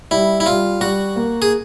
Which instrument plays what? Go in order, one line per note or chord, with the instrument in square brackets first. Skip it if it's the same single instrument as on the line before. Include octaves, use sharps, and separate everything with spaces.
[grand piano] G3 [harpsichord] E4
[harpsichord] E4
[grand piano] G3 [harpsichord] F4
[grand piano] G3 [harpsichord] F#4
[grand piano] A#3
[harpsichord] G#4